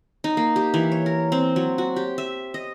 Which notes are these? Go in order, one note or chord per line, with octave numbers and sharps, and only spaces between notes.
D#4
A#3
G4
E3
C#5
A#4
C4
F#3
F#4
G4
E5
D#5